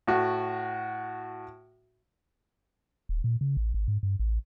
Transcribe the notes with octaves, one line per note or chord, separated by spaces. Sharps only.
A2 F#4
D#1
A#2
C#3
A1
G#1
G#2
G2
A1